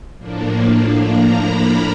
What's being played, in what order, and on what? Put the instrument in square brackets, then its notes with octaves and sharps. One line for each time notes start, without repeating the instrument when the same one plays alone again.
[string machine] A2 F3 A#3 D4
A#5
B5